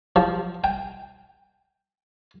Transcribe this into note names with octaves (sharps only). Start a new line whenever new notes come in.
F3
G5